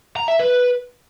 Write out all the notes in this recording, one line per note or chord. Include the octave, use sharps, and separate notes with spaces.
A#5
E5
B4